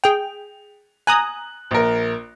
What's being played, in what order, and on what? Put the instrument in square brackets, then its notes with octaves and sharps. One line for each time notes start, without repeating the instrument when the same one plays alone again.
[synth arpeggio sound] G#4 G5 [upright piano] F7
[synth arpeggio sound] G#5 A#5 D#6 [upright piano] F#6 F#7
[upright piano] A#1 A#4